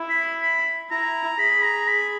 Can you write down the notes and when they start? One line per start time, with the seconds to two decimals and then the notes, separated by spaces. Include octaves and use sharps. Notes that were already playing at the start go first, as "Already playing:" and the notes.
Already playing: E4
0.10 B5
0.42 B5
0.90 E4 A#5
1.39 G#4 B5
1.64 A#5
1.88 B5